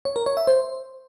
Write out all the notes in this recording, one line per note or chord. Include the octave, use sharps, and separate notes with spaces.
C#5
A#4
C#5
E5
C5